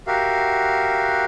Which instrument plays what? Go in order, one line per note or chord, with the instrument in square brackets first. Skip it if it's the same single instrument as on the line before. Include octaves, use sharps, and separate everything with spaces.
[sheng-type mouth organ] F#4 G4 A#4 E5 F5